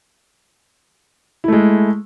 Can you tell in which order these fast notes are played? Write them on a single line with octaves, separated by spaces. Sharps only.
E4 A3 G#3